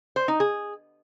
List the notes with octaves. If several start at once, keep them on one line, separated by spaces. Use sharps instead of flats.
C5
D#4
G#4